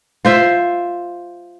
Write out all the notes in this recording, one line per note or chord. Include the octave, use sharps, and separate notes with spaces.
F4 C5 E5